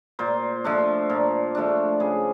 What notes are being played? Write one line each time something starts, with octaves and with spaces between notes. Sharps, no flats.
A#2 C5
F3 A3 D4
A#2
F3 A3 D4
C#3 G#4